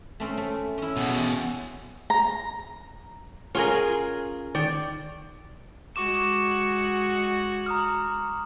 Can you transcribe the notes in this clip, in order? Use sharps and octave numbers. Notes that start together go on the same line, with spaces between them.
A3 C4 C#4
A3
C#4 E4
E2 B2
A#5
C#4 F4 G#4 A#4 G#5
D#3 D5
G#3 F#4 C#6 D6 E7
A#5 D#6 F6